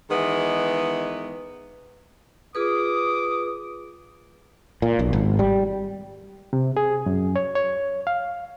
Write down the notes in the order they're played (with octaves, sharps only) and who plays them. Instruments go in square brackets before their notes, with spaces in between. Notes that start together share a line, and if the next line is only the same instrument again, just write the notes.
[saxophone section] D#3 E3 G#3 B3
[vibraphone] F4 G#4 B4 [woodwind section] D6 D#6
[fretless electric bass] A#2
B1
G#1
G3
[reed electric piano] C3
G#4
F#2
C#5
C#5
F5